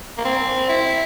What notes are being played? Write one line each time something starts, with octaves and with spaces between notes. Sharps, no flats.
A#3
C4
E4